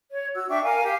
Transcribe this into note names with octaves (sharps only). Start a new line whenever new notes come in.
C#5
F#4 E6
D4 E5 G5 C#6
A#4 F5 G#5
G4 F5